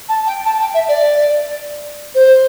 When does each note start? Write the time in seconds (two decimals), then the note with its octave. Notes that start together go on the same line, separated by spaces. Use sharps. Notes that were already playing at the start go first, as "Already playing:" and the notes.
0.08 A5
0.27 G5
0.45 A5
0.60 G5
0.74 E5
0.88 D5
2.15 C5